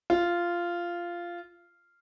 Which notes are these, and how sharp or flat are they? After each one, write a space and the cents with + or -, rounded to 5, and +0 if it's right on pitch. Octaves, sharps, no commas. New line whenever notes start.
F4 -10